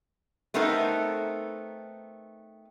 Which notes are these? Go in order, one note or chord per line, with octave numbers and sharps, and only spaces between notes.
A3 B3 C4 D#4 A4 A#4